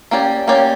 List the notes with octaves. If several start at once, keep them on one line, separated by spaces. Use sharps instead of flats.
A#3 C#4 G4 D5
A#3 C#4 G4 D5